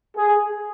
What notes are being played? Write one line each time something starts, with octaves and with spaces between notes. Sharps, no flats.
G#4